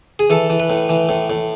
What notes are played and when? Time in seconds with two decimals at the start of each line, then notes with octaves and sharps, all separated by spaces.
0.19 G#4
0.30 E3 A4
0.50 E3
0.60 B4
0.70 A2
0.89 E3
1.09 A2
1.30 A2